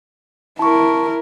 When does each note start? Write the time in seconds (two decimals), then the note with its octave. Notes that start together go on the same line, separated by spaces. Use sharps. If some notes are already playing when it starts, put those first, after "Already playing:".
0.59 E4 A#4 A5 C#6